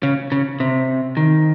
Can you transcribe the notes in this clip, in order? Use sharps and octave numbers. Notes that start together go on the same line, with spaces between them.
C#3
C#3
C3
D#3